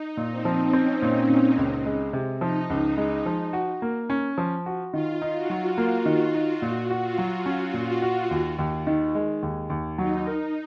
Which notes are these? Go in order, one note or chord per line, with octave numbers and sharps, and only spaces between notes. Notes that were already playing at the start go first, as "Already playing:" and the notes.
Already playing: D#4
A#2
C4
F3
C4 C#4
A#2
A#2
C#2
G#3
C3
F3 D#4
C#2
G#3
F3
F#4
A#3
C#4
F3
F#4
D#3 F4
D#4
F#4
F#3
A#3 F4
D#3
F4
D#4
A#2 F#4
F#4
F4
F#3
C#4 F#4
A#2
F4
F#4
D#2
D#2
D#3
G#3
D#2
D#2
F#3 D#4
A#4